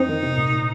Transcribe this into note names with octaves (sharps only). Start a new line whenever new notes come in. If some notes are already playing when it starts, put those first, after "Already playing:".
Already playing: F2 C4 D#4
D#3
C3
A#2
A#2